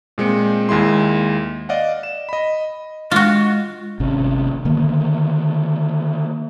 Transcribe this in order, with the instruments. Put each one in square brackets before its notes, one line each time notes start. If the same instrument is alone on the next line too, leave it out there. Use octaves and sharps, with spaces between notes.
[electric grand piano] A#2 G#3 C4 C#7
D#2 G#3 E4 C6
D5 D#5 F5 F#5
E7
D#5 B5
[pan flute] G#3 [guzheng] F4 F#4
[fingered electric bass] G#1 C3 C#4
D3 D#3 A#3